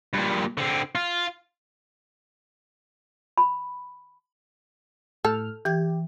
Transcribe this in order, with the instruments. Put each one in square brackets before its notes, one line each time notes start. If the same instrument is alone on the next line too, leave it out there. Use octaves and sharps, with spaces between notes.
[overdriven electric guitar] G2 A#2
D3 C4
F4
[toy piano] B5
[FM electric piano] A2 F6 [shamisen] A4 [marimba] G6
[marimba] E3 G6 G#6 [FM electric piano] G4